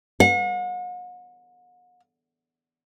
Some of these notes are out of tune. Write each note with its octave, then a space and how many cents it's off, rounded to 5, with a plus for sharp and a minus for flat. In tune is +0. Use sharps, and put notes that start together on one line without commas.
F#5 -40